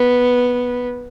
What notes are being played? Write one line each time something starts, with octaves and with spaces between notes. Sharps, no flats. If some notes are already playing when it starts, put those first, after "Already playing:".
Already playing: B3